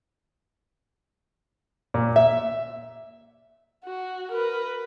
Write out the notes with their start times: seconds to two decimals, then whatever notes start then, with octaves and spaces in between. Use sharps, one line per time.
1.94 A#2
2.16 E5
3.84 F#4
4.31 A#4 B4